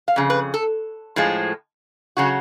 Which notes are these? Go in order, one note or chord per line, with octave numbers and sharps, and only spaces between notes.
F5
F2 C#3
B4
A4
A2 F3 G#3
C#3 F#3 F#4